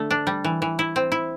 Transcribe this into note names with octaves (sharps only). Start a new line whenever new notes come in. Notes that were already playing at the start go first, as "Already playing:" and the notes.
Already playing: D3 A3
D4
G3
E3
E3
E4
C4
E4